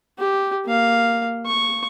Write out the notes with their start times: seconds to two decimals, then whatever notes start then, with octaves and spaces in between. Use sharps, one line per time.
0.18 G4
0.66 A#3 F5
1.47 C#6